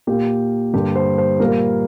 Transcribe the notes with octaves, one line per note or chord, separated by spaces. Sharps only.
A#2 A#3 G4
G2 D3 G3 A#3 G4
C5
C5
A#2 G3 A#3 A#4